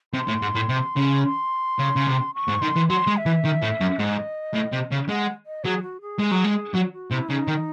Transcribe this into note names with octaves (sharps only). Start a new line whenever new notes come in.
C3 C6
A2
G#2
A2
C3
C#3
C6
C#3
C#3
C3
C#6
G#2
D#3 C6
E3
F#3 C6
G#3
E5
E3
D#3
A2
F#2
G#2 D#5
A2
C3
C#3
G#3 F#5
D#5
F#3 G#4
F#4
G#4
G#3
F#3
G#3
F#3 F#4
F#4
C3 E4
C#3 D#4
D#3